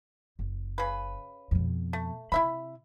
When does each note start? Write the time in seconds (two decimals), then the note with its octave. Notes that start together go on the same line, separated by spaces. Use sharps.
0.39 F#1
0.78 C#3 B4
1.51 F2 B2
1.93 A3
2.32 C3 E4 E5 B5